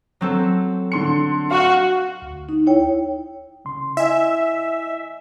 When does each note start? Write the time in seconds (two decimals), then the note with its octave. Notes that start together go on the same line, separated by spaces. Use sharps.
0.21 F#3 C4 A4
0.92 D3 C6 C#7
1.51 F#4 F5 C#6 F#6
2.22 D2
2.49 D#4
2.67 E4 C#5 G5
3.65 C2 C#3 C6
3.97 E4 D#5 E5 G#5